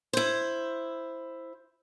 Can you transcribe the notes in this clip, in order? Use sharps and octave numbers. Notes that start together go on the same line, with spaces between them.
E4 C5